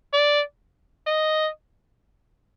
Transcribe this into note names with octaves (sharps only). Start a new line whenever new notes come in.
D5
D#5